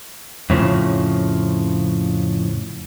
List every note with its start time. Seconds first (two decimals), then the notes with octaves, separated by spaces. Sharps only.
0.50 F2 A2 C#3 F3